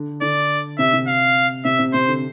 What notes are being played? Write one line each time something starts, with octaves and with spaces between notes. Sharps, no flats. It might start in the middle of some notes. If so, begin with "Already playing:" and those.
Already playing: D3
D3 D5
C3 E5
C3
F5
C3 E5
C3
C3 C5
D3